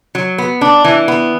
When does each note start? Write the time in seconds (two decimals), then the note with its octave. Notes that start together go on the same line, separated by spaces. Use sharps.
0.15 F#3
0.38 B3
0.61 D4
0.84 E3
1.08 B3